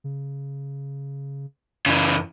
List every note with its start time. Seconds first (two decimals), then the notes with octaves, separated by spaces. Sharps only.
0.04 C#3
1.86 F#2 C#3 E3